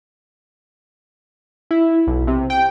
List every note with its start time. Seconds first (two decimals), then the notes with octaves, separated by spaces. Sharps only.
1.71 E4
2.07 B1
2.27 C3
2.50 G5